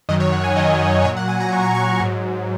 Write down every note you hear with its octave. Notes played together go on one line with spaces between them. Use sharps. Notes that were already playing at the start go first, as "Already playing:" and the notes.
F#2 D#3 F#3 D#5
C#5
F#5
G#5
F#2 D#3 F#3 D#5
A#2 F#3 C#5
F#5
G#5
A#5
A#2 F#3 C#6
A#5
C#6
G#2 F#3